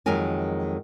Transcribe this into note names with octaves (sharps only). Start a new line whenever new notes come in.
F2 D#3 F#3 G#3 A#4 G#5